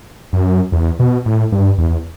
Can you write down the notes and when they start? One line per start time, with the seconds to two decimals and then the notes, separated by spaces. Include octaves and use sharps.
0.33 F#2
0.72 E2
0.99 B2
1.26 A2
1.52 G2
1.78 E2